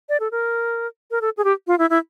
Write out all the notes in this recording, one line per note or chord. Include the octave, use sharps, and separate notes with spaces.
D5
A4
A#4
A#4
A4
G#4
G4
F4
E4
E4